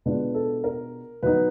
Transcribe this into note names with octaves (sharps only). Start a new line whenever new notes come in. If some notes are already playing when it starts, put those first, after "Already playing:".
B2 G#3 B3 D4 F4 B4
A4
A#4
B2 F#3 B3 D#4 B4